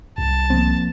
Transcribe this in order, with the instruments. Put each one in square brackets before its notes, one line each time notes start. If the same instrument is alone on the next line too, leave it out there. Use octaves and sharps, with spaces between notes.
[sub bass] C2 [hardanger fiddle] A5
[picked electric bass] F3 A#3 C4